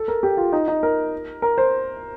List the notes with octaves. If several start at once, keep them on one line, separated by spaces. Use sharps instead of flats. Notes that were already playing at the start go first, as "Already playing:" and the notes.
Already playing: A4
A#4
G4
F4
D#4
D#4
A#4
A#4
C5